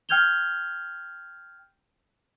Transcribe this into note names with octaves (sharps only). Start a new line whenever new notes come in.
G5 F6 G6 G#6 F7 G7